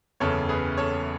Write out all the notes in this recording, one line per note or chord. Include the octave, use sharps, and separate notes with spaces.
F#1 E2 C#3 A4 C#5
G#4 B4
A4 C#5